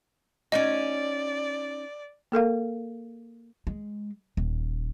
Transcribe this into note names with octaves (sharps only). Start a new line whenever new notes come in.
C#4 D#4 F#4 D5 D#5
A#3 A4 A#4 F5
G#3
D#1